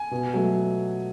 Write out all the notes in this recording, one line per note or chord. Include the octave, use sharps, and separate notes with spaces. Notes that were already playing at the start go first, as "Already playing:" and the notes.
Already playing: G#5
B2
F#3 A3